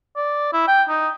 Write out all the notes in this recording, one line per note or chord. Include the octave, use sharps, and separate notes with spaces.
D5
E4
G5
D#4